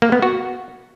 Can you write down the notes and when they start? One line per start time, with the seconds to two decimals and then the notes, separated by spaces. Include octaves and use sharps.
0.02 A#3
0.12 B3
0.22 F#4